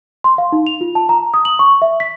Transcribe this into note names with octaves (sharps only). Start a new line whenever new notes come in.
C6
F5
D#4
F7
F4
A5
A#5
D#6
F#7
C#6
E5
B6